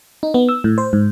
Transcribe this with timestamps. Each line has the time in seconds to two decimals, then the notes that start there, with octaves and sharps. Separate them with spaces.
0.23 D#4
0.34 B3
0.49 E6
0.64 A2
0.78 C5
0.93 G#2